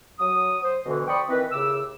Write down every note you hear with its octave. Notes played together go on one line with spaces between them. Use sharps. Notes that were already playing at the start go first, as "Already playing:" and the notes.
F#3 D#6
C5
D2 B2 D3 E3
C5 D5 G5 B5 C#6 D#6
D#3 E3 C4 B4
D#2 A2 C#3 D6 E6